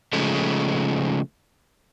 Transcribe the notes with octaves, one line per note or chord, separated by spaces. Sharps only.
C#3 F3 G#3 A3